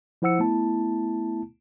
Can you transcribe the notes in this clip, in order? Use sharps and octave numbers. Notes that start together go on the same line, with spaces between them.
F3 E4 C5 F#5 E6 C#7
A3 B3 E4 A5